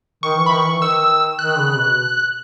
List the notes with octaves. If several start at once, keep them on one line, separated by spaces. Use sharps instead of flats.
D#3 C#6
E3
B5
D#3 C#6
E3
D#3 E6
D#3 F#6
C#3
B2